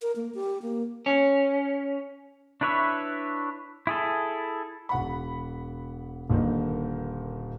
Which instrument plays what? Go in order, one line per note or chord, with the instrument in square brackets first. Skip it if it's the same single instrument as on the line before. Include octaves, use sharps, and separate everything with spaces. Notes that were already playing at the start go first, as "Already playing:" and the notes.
[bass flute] A#4
A#3
G4
A#3
[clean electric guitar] C#4
[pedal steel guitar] D4 E4 B4 C#5 E5
E4 G#4 A4
[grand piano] E1 F#5 B5
D#1 A#2 D3 D#3